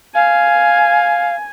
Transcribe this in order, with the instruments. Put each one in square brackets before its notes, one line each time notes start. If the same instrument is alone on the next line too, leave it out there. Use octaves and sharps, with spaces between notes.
[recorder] F5 [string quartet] G#5